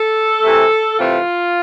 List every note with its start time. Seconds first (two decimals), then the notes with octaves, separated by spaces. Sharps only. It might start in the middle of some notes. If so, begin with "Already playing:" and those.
Already playing: A4
0.44 C3 E3 A3 C4
0.99 C3 E3 A3 C4 F4